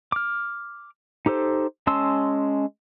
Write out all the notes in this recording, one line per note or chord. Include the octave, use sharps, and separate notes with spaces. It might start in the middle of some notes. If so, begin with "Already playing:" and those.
D6 F6
D#4 G4 A4 C5
G#3 C#4 A5 C6 E6